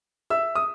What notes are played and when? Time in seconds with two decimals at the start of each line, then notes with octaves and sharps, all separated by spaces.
0.30 E5 E6
0.55 D#6